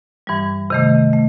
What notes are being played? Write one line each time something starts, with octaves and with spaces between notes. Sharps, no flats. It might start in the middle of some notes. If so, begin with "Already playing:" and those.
G2 E3 G3
C3 D#3 A3
A3